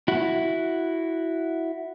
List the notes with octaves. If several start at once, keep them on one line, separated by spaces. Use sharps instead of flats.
E4 F#4